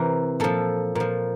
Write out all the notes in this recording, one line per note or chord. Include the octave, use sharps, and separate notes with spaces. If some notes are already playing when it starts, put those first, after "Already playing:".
Already playing: C3 E3 A#4 C5
A#2 F3 A4
A#2 F3